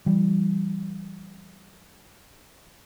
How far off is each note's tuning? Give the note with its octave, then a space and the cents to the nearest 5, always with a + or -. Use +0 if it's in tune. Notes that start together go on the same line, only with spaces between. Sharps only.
E3 +35 G3 +0